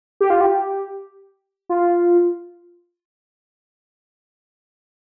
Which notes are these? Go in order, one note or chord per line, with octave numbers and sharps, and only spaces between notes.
G4
F4
G4
F4